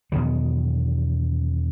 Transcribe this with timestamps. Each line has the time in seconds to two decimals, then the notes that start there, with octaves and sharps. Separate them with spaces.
0.12 E2 B2 D#3 F#3